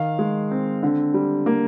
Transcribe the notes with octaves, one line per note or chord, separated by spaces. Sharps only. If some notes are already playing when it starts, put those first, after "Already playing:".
Already playing: D#3 F5
G#3
C4
D3
G3
A#3